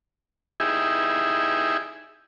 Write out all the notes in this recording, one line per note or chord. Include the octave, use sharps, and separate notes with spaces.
D#4 E4 G4 G#4 E5